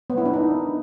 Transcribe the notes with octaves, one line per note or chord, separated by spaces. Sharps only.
B3
E4
D4
D#4